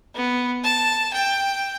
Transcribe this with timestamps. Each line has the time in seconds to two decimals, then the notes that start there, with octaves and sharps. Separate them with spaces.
0.15 B3
0.64 A5
1.13 G5